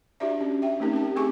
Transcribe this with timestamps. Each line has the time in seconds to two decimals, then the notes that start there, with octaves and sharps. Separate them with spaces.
0.20 D4 E4 F#4 G4 D5 E5
0.41 C#4
0.62 E5 G5
0.80 A3 C4 C#4 D#4 G4 A#4
0.93 G4 A5
1.16 C4 G#4 G#5 C#6 D6